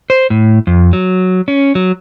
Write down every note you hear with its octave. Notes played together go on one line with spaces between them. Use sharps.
C5
A2
F2
F#3
C#4
F#3